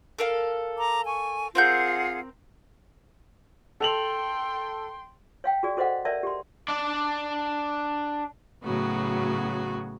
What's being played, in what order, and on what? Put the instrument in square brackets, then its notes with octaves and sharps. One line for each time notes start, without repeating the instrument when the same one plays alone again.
[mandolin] A4 A#4 F5
[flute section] A#5 D6
G#5 C#6
[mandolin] C4 A#4 G6 [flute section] F4 G#4 F#5
[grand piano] A4 F7 F#7 [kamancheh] G5 C6
[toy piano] C#5 F5 G5
F#4 G#4 D5
F#4 A4 C5 D#5 F5 F#5
A#4 C#5 D5 E5 A5
G4 C6
[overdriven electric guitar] D4 D5
[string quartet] A2 C#3 F#3 B3 F#4